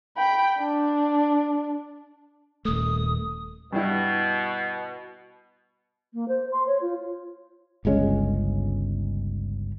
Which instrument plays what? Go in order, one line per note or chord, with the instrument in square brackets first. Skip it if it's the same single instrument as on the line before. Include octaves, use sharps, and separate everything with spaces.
[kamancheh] G5 B5
D4
[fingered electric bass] D#1 A3 [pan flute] D#6
[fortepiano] G2 E4 [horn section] B2
[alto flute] A#3
C5
C6
C#5
F4
[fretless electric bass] G1 C#2 G#3 C#4